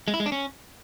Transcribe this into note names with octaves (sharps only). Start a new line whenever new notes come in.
G#3
E4
G#3
D4
C#4